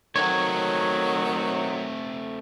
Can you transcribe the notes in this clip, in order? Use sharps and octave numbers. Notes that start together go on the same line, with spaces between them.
D#3 F#3 A3 C4 C#5